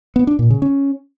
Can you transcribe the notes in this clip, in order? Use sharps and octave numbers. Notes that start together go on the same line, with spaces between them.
B3
D4
A#2
C#3
C#4